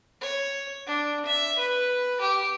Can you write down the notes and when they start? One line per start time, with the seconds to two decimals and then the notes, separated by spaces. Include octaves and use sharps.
0.21 C#5
0.87 D4
1.26 E5
1.58 B4
2.21 G4